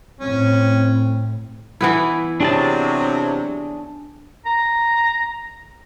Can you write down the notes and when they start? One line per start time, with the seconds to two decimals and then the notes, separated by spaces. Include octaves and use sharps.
0.21 A2 C4 C#4
1.81 E3 B3 E4
2.40 C3 F#3 D4 G#4 A5
4.46 A#5